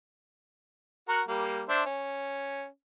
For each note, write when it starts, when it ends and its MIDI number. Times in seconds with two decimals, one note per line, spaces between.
1.09 1.22 66
1.09 1.22 70
1.09 1.22 78
1.28 1.63 55
1.28 1.63 58
1.69 1.82 62
1.69 1.82 72
1.69 1.82 76
1.86 2.66 61